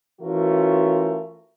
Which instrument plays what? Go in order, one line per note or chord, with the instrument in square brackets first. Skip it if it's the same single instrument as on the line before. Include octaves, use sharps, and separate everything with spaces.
[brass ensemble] E3 A3 C#4 F4 F#4 A#4